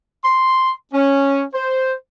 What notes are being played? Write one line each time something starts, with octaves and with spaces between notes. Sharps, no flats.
C6
C#4
C5